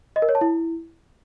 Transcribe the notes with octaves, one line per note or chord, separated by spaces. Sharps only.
D#5
A#4
C#5
A5
E4